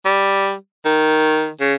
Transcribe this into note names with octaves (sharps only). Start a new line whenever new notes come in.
G3
D#3
C#3